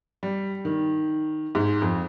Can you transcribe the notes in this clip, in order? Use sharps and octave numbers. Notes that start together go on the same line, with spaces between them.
G3
D#3
G#2
F2